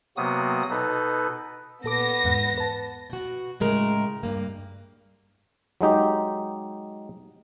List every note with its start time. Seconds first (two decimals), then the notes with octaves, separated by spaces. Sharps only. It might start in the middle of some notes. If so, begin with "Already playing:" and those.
0.17 C3 F#3 A#3 B3 F#4 D#6
0.70 B2 D#4 A4 B4
1.84 A#2 B3 A4 D6 A#6
2.24 E2 G#2 F#5
2.58 B4 A5
3.10 B2 F#4
3.60 A2 C#3 G#3 A#4
4.23 G2 A#3
5.81 F#3 G#3 D#4 G4